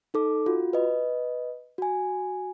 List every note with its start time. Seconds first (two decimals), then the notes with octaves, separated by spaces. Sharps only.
0.14 D#4 A4 D6
0.46 F4 F#4
0.73 B4 D#5
1.78 F#4 G#5